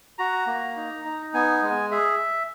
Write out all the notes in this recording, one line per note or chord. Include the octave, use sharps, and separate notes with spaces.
F#4 A#5
A#3
D#4
D#4
B3 G#5
G#3
G#4 E5